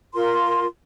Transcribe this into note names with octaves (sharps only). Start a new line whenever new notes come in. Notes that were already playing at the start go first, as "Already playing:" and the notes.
F4 A#4 C6